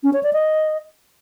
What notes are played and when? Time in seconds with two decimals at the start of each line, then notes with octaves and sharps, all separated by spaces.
0.03 C#4
0.13 C#5
0.23 D5
0.33 D#5